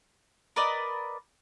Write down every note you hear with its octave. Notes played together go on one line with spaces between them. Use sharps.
A#4 B4 D5 D#5